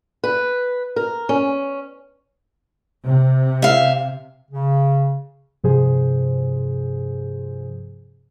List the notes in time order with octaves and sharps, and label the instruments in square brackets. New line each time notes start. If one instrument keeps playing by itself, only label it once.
[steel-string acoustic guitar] B4
A#4
C#4
[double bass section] C3
[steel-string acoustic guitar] E5 F5
[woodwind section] C#3
[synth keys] G2 C3 F3 G#4 C5